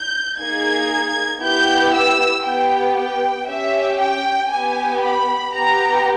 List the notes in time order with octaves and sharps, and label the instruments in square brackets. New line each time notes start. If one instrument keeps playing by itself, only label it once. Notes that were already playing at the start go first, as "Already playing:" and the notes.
Already playing: [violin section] G6
A#3 D#4 G#4 G#6
B3 E4 G4 G6
E6
B3 G4 G5
G5
C#4 G4 E5
G5
B3 G4 G#5
B5
B3 G4 A#5